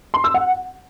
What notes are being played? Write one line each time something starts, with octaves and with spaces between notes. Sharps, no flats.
C6
E6
F#5